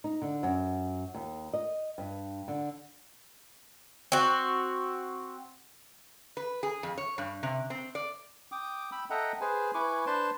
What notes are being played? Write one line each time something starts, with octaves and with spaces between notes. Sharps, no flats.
D#4
D3
F#2
D#2
D#5
G2
D3
C4 F#4
B4
G#4
F2
C#5
G2
C3
C4
D5
G5 D6 D#6
G5 B5 E6
A4 D#5 E5 F#5 G5 A#5
G#4 B4 C5 G#5
E4 B4 G#5 C#6 D6
D4 B4 C5 A5 C6